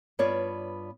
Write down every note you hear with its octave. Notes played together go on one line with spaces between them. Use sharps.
G2 B3 F4 C#5 D5